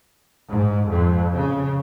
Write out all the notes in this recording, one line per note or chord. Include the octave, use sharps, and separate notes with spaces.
G#2
F2
C#3